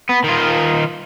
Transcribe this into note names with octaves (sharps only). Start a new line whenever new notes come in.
B3
D#3 F4